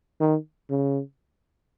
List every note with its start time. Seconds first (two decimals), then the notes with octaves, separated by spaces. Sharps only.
0.20 D#3
0.70 C#3